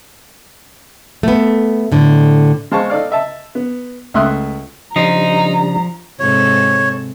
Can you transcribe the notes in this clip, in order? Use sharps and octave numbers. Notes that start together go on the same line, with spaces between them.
A3 B3
A2 D3
G#3 C5 F5 A5 C#6
D#4 A4 D5 F5
D#5 E5 A5
B3
C#2 A3 E5 C6 D#6 F#6
C#3 F3 G3 D4 D#4 A#5
G#2 C3 A4 C#5